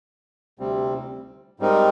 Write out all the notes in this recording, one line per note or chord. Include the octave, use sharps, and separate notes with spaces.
D2 C3 G3 C4
G#2 G3 C4 D#4 A#4